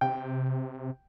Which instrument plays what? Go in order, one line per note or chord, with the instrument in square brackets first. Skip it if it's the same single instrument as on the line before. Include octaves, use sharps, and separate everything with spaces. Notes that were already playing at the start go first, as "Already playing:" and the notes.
[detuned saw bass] C3 [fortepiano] G5